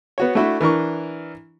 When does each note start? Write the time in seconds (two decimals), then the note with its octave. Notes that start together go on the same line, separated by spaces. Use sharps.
0.18 B3 F#4 C#5
0.35 A3 D4 E4 F#4 A4
0.61 E3 D4 A#4 C#6